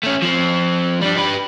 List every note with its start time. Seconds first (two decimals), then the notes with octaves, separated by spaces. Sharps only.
0.04 A3 C#4
0.23 F3 C4
1.01 G3 D4
1.17 G4 B4